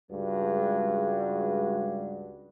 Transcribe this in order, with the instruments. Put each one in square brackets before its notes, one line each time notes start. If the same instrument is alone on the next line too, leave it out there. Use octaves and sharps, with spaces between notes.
[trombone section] C#2 G2 G#3 F#4